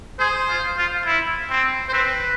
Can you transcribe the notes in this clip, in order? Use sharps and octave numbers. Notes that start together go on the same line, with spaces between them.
G#4 C5
F4
F4
E4
C4
C5
C4 B4